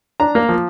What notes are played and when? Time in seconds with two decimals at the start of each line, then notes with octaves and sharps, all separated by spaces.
0.20 D4 A#5
0.35 A#3
0.49 F3